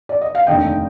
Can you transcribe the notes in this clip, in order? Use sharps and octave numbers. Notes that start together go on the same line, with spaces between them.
D5
D#5
F5
F1 D#2 D3 D#5 G5